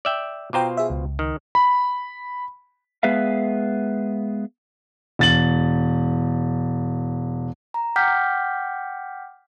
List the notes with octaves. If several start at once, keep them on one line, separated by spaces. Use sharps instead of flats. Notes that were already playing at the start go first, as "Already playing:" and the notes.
D5 E5 G5
B2 F4 C5 G5 A#5 D6
G#4 E5
C#2
D#3
B5
G#3 B3 G#4 B4 E5 F5
E1 A6 F#7
A#5
F#5 G5 D6 F6 G6 B6